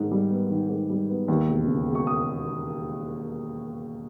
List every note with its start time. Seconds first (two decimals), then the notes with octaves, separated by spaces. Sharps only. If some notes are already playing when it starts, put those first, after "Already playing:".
Already playing: G#2 D#3
0.11 G3
0.30 B3
0.50 D#3
0.69 G#2
0.90 G3
1.09 B3
1.28 D#2
1.49 E1
1.67 C#3
1.87 E1
1.95 C#6
2.07 D#6